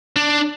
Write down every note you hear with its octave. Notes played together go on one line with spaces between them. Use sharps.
D4